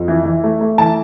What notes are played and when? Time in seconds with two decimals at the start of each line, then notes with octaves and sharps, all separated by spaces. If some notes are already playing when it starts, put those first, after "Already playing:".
Already playing: F2
0.08 E3
0.25 E3
0.44 A3
0.61 A3
0.78 E3 A5